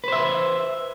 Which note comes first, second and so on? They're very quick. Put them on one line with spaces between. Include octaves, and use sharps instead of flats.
B4 C5 E5